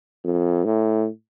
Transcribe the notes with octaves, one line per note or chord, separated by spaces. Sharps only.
F2
A2